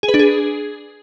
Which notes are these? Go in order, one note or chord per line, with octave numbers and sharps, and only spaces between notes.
G#4
B4
D4
G#4